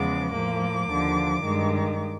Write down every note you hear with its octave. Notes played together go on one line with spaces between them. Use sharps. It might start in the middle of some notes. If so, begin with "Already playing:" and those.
Already playing: E2 C#3 F3 G#3 B3 D6
A2 F3 A#3 D6
D#2 D3 F3
G2 D#3 G#3